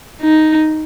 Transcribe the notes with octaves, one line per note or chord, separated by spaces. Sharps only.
D#4